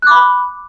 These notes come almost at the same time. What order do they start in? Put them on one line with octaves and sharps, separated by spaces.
F#6 D6 B5